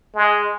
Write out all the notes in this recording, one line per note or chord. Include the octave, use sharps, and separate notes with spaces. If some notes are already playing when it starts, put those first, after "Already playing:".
G#3